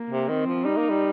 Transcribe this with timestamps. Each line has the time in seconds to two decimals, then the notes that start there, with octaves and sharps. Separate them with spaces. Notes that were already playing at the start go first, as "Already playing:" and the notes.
Already playing: A#3
0.10 C3
0.28 D#3 C4
0.47 F3
0.64 G3 D#4
0.77 A#3
0.90 G3